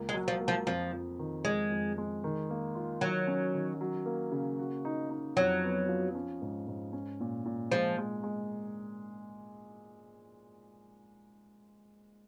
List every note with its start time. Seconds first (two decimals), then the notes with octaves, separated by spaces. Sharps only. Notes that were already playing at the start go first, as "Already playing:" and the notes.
Already playing: C#2 A#3
0.09 G#3
0.14 F#3
0.28 F3
0.40 A#3
0.48 F3
0.67 F2 F3
0.93 F2
1.19 D#3
1.45 F2 G#3
1.71 F2
1.98 G#3
2.24 D#3
2.50 A#3
2.75 F4
3.01 D#3 F#3
3.27 C#4
3.54 D#3
3.81 F#3
4.06 A#3
4.32 C#3
4.59 F#4
4.85 D#4
5.10 D#4
5.36 F2 F#3
5.64 B3
5.88 F3
6.15 C#4
6.42 G#2
6.68 G#2
6.93 C#4
7.20 A#2
7.45 A#2
7.72 F3 G#3
7.98 G#3
8.23 G#3